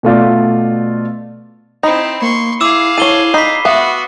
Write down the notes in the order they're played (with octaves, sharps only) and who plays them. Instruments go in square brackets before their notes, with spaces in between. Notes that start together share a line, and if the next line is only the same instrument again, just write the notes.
[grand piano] B2 A3 F4 D5
[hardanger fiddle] C4 E4 [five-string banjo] D#4 [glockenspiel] B5
[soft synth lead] A#3 [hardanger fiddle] C6 C#6
[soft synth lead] E4 [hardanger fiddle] G#4 F5 [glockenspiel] D6 E6 E7
[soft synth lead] E4 [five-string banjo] A4 C#5 [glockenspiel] D#7 G7
[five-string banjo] D#4 [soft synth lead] B5 [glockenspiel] B6 C7
[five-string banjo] B3 E5 F5 [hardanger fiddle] F#4